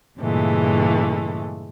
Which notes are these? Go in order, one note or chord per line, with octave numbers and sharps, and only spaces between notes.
G2 A#2 C#3 E3 G#3 A3